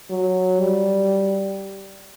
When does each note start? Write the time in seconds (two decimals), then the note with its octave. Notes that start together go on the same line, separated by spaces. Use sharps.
0.11 F#3
0.59 G3